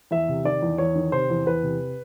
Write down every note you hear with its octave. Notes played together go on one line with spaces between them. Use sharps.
E2 E5
C3
D#3 D5
E2
E2 C#5
D#3
C3 C5
E2
E2 B4
C3